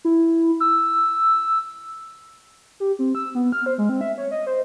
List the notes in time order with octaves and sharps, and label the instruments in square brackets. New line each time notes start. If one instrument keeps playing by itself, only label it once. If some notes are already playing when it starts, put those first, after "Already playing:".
[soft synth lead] E4
E6
G4
C4
E6
B3
F6
C5
G#3
C4
E5
C#5
D#5
C5